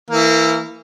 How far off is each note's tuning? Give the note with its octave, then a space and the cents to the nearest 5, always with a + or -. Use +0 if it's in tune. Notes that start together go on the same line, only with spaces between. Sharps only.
E3 +0 A#3 -25